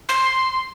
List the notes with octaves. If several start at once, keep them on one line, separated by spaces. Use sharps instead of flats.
C6